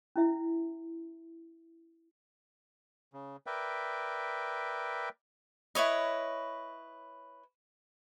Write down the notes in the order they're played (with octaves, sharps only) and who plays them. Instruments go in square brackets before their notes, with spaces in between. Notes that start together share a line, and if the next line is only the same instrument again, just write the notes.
[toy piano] C#4 E4 E5
[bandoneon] C#3
A#4 B4 D5 E5 G5
[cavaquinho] E4 B4 C#5 D#5